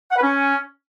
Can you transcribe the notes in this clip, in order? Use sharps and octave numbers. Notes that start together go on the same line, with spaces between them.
F#5
B4
C#4